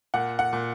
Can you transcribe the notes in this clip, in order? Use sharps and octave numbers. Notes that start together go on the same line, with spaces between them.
A#2 F#5
F#5
A#2